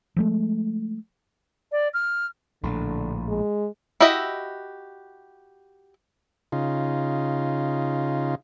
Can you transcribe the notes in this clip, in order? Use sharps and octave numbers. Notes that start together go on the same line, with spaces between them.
F3 G#3 A3
D5
F6
A#1 A2 D3
G#3
E4 F#4 G4 D#5 E5
C#3 D#4 F4